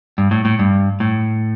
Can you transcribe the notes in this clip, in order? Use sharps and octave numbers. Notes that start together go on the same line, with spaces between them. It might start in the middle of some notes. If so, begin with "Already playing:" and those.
G2
A2
A2
G2
A2